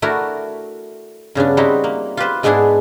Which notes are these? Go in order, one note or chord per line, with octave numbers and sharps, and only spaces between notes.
A3 D4 E4 F#4 A#4
G2 C#3 B3 D4
G3 C4 D#4 E4 F#4
A#3
F4 G4 B4 C5
G#2 G#3 B3 D4 E4 G#4